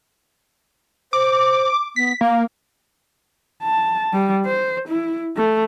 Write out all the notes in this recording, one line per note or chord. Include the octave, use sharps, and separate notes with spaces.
C5 D6
B3 B6
A#3 F5
A5
G3
C5
E4
A3